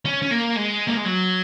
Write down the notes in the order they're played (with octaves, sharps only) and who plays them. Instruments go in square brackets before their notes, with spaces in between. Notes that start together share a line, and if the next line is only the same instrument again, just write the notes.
[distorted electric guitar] C#4
C#4
A#3
G#3
A#3
G#3
F#3